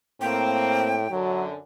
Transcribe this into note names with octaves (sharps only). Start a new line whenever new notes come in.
A2 A#3 C4 G5
F#2 D3 F#3